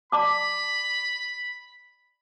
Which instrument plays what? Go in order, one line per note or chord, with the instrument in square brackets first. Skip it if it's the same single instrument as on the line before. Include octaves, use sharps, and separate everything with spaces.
[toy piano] D5 A5 D6 [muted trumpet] B5